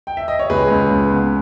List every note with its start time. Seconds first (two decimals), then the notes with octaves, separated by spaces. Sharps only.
0.07 G5
0.17 E5
0.28 D#5
0.39 C#5
0.50 C#2 G#4 B4
0.70 C#2
0.90 C#2
1.10 B3